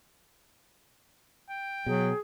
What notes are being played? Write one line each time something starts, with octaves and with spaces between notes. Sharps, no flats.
G5
B2 F#3 G#4